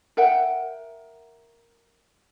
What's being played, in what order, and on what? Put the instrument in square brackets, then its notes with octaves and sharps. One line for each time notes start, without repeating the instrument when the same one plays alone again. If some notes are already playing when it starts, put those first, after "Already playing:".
[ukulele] A#4 E5 F#5 G5